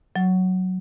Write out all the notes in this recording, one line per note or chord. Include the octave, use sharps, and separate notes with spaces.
F#3